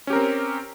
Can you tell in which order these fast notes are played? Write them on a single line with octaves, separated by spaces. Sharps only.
C#4 G4 A#4 C4